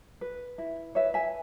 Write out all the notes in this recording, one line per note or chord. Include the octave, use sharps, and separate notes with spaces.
B4
E4
B4 C#5 E5
E5 G#5